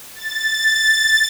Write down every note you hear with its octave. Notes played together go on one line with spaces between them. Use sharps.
A6